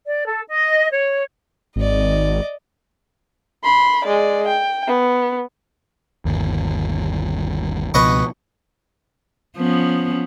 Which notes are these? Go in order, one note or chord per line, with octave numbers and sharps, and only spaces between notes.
D5
A4
D#5
C#5
G#1 D5 D#5
B5 C6
G#3 D5
G5
B3
G1 D#2
C#2 B2 F3 B4 D#5 C#6
F3 B3 C#4